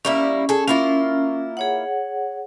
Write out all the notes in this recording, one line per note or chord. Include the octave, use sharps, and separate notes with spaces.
G3 A#3 C#4 E4
G#4 A4
A#3 C#4 E4 F4
G#4 C#5 F#5